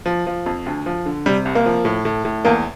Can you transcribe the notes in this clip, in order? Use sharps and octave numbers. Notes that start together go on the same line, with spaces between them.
F3
F3
F2
D2
F3
D3
C3 G3
C2
A#3
F3
A2
A2
A2
E2 A#3